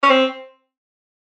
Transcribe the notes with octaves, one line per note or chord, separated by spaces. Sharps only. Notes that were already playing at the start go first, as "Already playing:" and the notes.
C#4
C4